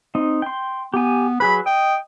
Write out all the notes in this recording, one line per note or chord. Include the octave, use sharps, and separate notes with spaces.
C4 D#4
G5 C6
B3 G4 G#5
F#3 G#4 B4 B5
D#5 G5